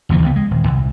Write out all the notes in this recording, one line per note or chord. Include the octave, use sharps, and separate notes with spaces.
F#1 D#2 E3 F3
C#2 D3 A3 B3
G#3
D#1
C2